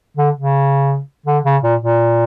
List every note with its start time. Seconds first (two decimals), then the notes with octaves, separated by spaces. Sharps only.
0.17 D3
0.36 C#3
1.26 D3
1.44 C#3
1.63 A#2
1.81 A#2